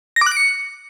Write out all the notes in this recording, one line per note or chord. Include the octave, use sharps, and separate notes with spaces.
A#6
D6
F#6
D7
C#7